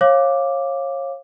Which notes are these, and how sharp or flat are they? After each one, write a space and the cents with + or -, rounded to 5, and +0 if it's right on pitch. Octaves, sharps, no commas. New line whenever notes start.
C#5 -30 F5 +0 D6 +0